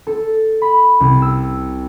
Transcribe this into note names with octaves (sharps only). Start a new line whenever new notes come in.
A4
B5
C2
E6